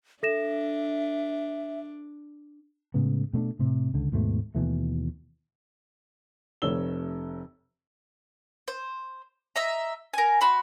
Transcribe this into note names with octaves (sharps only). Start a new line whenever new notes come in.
D4 A4 E5 A#6 E7
A2 C#3 G#3 B3
B2 A3 C#4 D4
A2 C3
C#2 D3
D#2 G#2 B2 A3
D#2 B2 E3 A3
F1 C3 A3 C#5 E6 G7
C5
D#5 E5 A#5
A#4 G#5
F#4 B5 C6